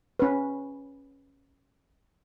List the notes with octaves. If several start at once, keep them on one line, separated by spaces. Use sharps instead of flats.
C#4 B4